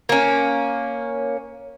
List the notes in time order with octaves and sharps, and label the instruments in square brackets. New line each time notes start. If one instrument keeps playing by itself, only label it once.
[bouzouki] A#3 C#4